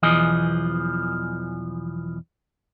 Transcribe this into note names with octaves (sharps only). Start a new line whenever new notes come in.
B1 E2 E3 F3 G#4 D#5